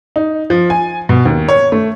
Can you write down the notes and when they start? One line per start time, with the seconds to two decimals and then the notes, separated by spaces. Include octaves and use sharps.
0.16 D#4
0.50 F3
0.70 G#5
1.09 B2
1.25 D#2
1.48 C#5
1.72 A3